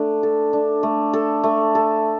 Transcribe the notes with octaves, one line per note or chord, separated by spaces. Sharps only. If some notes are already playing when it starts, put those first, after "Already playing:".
Already playing: A3 D4
A4
D4
A3
A4
A3
A4